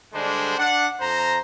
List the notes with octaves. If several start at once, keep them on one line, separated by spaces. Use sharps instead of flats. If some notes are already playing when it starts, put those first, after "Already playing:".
D3 G3 G#3 D4 C5
D4 D5 F#5
F2 C5 A#5